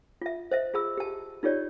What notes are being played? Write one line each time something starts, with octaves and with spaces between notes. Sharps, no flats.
F4 E5
C5 D#5 E5
F4 G#4 B5 E6
G4 A5
D#4 F4 G4 C#5 D5